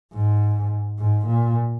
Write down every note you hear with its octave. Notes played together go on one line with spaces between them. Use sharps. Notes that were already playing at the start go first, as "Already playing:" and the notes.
G#2
G#2
A#2